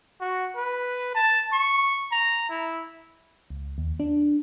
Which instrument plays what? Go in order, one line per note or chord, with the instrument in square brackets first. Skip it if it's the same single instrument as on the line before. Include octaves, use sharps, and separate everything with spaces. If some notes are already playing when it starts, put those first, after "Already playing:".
[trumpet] F#4
B4
A5
C#6
A#5
E4
[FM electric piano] C#2
D#2
D4